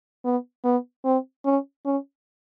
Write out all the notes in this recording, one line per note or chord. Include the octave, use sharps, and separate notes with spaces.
B3
B3
C4
C#4
C#4